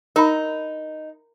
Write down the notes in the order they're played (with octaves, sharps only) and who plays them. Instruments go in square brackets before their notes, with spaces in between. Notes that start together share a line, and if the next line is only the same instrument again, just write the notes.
[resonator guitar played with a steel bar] D#4 [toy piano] A#4 B5